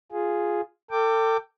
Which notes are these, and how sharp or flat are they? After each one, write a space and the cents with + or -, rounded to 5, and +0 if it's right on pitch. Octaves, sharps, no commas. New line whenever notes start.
F4 +0 G#4 +0
A4 +35 G5 +0 D6 +0